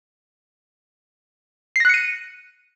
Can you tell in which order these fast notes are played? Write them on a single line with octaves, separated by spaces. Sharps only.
C7 A#6 F#6 C#7 D#7